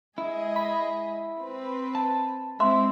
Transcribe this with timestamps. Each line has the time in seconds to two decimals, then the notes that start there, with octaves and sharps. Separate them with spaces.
0.18 G#3 E4 G#4 D#5
0.56 B5
1.40 C4 B4
1.95 A5
2.60 G#3 C4 E4 E5 C6